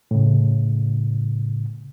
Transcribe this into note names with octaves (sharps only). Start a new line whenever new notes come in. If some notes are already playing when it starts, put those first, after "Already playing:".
A2 C#3